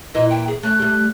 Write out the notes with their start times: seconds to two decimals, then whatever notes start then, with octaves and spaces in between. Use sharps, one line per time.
0.15 A#2 E3 E4 D#5
0.30 G5
0.48 G#4
0.63 A3 C#4 F#6
0.79 G3 A3